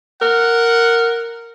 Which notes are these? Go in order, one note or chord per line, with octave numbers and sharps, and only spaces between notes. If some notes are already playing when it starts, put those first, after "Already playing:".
A#4 F#5